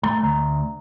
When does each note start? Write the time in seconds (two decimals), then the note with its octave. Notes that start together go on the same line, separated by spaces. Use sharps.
0.03 A3 A#5
0.22 D2 A#5